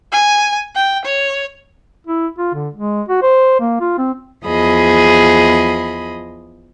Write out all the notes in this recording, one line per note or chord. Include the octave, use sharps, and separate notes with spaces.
G#5
G5
C#5
E4
F4
D3
G#3
F#4
C5
A#3
F4
C4
E2 F3 G#4 D#5 B5